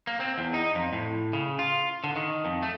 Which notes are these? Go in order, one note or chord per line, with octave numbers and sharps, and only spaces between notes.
A#3
C4
E2
D#4
F2
A2
C#3
F4
D3
D#3
F2
A3